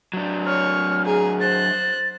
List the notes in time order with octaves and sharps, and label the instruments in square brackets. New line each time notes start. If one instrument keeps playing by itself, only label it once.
[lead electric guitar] F#3 D4
[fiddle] C#5 [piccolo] F6
[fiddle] G#4 [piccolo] A#5
[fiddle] C5 F#6 [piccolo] A6